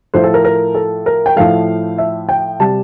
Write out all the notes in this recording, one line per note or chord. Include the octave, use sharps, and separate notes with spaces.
A2 F3 A3 C5
A4
A#4
A#4
A4
A#4
G5
A2 F3 A3 F5
E5
G5
C3 G3 A5